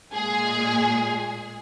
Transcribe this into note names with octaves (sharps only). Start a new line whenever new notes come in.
A#2 G#3 G#4